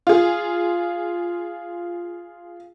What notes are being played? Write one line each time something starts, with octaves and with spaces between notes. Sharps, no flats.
F4 G#4